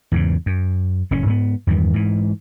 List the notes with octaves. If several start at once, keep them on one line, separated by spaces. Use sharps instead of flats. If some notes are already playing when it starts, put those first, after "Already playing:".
E2 G#2 C#3
F#2
F#1 A2 C#4
G#2 B3
E2 G2 D#3 E3
G#2 E3